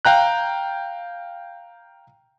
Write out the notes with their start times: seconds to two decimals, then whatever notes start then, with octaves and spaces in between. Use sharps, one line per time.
0.05 F5 G5 A#5 F#6